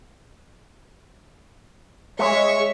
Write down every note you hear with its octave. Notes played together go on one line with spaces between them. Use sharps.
G#3 C#5 E5 C#6